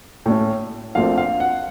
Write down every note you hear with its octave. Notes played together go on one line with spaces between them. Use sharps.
A2 A3 C#4
A#1 A#2 A3 C4 F5
F5
F#5